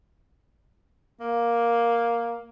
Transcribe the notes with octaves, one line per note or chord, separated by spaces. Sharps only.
A#3